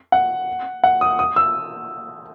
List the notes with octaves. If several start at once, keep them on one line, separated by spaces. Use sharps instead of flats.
F#5
F#5
D#6
D#6
E6